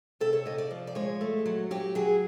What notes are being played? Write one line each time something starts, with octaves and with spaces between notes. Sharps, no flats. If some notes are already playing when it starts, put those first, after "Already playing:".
C3 A4
C#5
C3 D#5
D5
F3
D5
G#3 C#5
A3
F#3
F#3 G4
F#3 G#4